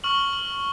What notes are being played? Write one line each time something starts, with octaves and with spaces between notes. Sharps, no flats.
C#6 F6 F#7
F#7